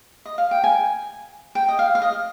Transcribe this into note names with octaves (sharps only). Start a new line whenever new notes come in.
D#5
F5
G5
G#5
G5
D#5
F5
F5
D#5